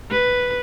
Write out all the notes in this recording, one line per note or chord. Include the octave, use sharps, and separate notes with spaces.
B4